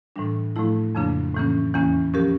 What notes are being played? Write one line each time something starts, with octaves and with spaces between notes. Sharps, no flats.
A2 E3 G3 D4
A2 F3 A3 E4
F2 C#3 F3 A#3 D4
A2 E3 A#3 C#4
E2 E3 A#3 C#4
F3 C#4 G4 A#4